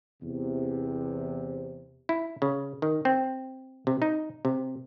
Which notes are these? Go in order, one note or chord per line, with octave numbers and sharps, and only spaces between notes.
E2 C3
E4
C#3
D#3
C4
C3
D#4
C3